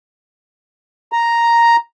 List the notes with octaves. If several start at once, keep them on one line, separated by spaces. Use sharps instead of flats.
A#5